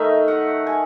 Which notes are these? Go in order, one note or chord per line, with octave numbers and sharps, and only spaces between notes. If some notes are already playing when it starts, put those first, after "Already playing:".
Already playing: D#3 A3 D#4 E5
F#5
G#5